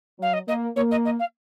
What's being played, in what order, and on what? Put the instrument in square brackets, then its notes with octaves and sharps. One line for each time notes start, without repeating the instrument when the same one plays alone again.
[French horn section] F#3 [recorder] F5
[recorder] D#5
[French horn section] A#3 [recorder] D#5
[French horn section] A#3 [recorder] C#5
[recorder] D#5
D#5
F5